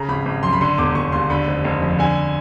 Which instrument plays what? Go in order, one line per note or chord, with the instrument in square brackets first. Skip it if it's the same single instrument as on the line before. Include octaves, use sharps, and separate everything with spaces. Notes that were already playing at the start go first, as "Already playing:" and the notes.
Already playing: [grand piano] C#3 A#5
G#1 B5
G#1
F#2 C6
B5
D3 C6
E1 D6
E1 C#6
D#2 C6
D3 B5
F1
F1
F2
D3 G#5